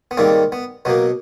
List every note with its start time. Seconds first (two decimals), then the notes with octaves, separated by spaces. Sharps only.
0.11 B3
0.17 G#2 D#3 G3 A#3 C4
0.52 B3
0.85 B2 F#3 A#3 B3